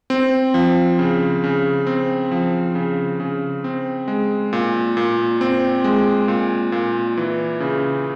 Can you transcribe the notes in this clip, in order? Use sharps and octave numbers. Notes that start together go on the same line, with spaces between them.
C4
F3
C#3
C#3
C4
F3
C#3
C#3
C4
G#3
A#2
A#2
C4
G#3
A#2
A#2
E3
C#3